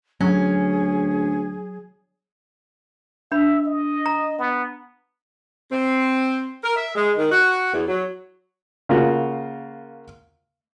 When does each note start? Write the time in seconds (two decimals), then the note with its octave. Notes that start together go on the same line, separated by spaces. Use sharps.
0.20 D2 F#3 C#4 G#4
3.32 D4 E5 B5
3.65 D#5
4.06 A#5
4.39 B3
5.72 C4
6.63 A#4
6.76 E5
6.96 G#3
7.17 D#3
7.32 F#4
7.74 E2
7.88 F#3
8.89 C#3 A#3 F4 F#4